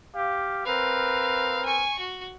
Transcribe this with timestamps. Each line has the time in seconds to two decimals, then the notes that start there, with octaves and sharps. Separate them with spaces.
0.13 G4 F5
0.66 C4 A#4 B4 F5
1.65 G#5 C#6
1.99 F#4